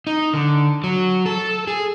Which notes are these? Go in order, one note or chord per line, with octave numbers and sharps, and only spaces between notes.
D#4
D3
F#3
A4
G#4